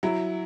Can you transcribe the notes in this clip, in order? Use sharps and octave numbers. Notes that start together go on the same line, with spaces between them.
F#3 E4